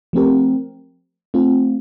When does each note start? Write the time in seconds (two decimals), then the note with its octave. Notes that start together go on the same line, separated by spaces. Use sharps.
0.13 F3 A3 C4 G4 A#4
1.34 A3 C4 F4